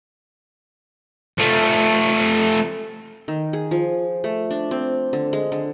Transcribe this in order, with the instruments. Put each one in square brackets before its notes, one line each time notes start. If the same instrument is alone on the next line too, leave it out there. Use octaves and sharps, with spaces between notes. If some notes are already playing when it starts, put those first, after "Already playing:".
[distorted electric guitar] F3 A3
[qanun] D#3
G#4
F3
A3
D4
C4
D3
G#3
D3